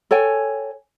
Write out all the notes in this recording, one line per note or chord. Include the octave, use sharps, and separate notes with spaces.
A4 C#5 G5 G#5